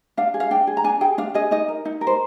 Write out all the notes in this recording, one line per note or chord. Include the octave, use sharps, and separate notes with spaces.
D4 F5
G#4
F5
D4 G5
G#4
A#5
D4 G#5
G#4 G5
D4 F5
G#4 D#5
D#4 D#5
A#4
D#4
A#4
C5